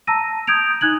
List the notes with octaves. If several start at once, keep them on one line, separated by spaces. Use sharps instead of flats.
A5 A#5 E6 A#6 D#7
D#6 G6 G#6 D7 F7
D#4 F#6 G#6 F#7